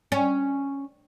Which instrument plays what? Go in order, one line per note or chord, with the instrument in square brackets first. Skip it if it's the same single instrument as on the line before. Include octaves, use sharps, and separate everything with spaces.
[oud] C#4